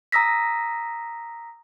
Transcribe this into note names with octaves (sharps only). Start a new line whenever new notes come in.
A#5 D#6 E6 A#6 B6